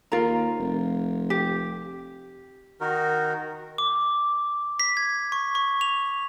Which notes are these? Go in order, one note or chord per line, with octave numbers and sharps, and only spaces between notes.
D#2 F4 A#4 A#5
F1
G4
D#3 D#4 F#4 A#4
D6
B6
G#6
C#6
C#6
F7